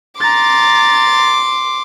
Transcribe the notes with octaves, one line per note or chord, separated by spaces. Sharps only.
A#5 C6 D6 A6